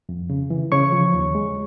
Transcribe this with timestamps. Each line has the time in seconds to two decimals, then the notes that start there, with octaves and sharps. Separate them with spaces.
0.09 F2
0.30 C#3
0.50 E3
0.72 C#3 C#5 C#6
0.92 F3
1.14 D#2
1.35 G#3